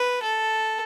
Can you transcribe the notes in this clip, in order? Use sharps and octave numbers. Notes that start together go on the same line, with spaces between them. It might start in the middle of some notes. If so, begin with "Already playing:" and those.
Already playing: B4
A4